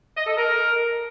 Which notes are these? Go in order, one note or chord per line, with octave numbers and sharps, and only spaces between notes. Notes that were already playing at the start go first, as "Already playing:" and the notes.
D#5
A4
A#4